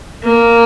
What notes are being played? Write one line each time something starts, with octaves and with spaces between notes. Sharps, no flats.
A#3